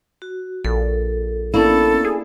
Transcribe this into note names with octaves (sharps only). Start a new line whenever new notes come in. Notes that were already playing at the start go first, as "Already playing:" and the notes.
F#4
A#1 A4
A#3 B3 C#4 D4 E4 A4
G#4